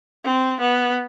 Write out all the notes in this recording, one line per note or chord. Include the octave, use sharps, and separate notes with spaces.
C4
B3